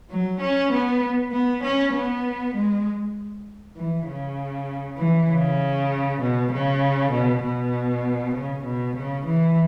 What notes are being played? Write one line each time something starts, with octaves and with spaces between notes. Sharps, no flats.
F#3
C#4
B3
B3
C#4
B3
G#3
E3
C#3
E3
C#3
B2
C#3
B2
B2
C#3
B2
C#3
E3